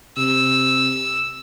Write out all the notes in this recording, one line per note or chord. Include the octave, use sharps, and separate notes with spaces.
C3 E6